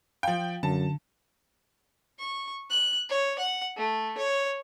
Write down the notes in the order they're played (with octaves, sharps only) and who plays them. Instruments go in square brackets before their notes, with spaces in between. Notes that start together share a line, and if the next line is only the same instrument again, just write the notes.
[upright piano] F3 G5 [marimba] F5
[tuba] F#2 [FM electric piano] D3 [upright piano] A5
[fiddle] C#6
F#6
C#5
F#5
A3
C#5